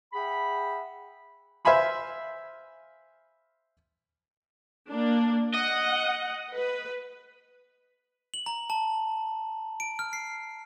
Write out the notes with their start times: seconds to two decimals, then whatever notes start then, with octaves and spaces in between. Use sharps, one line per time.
0.13 G#4 E5 F#5 G5 B5
1.65 C5 E5 F5 G#5 B5 C6
4.89 A#3 D4
5.54 D#5 F#5
6.53 B4
8.34 F#7
8.46 A#5
8.70 A5
9.80 D7
9.99 F6
10.13 C7